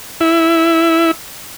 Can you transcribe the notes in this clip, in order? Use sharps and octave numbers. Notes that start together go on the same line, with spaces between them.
E4